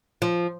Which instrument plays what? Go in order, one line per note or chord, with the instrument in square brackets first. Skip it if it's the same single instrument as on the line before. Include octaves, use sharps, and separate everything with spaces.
[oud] F3